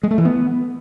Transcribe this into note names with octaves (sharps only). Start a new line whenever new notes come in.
G#3
A3
E3
B3